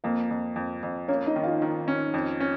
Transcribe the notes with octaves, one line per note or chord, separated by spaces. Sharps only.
F2 A#3
F2
F2
F2
A#3 C#4 C#5
D#4 D#5
D#3
F4 F5
D#3
C#4
F2
C#4